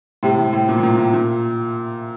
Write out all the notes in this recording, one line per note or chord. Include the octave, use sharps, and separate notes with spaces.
A2 C3
A2
A2
A#2
A2
A#2
A2
A#2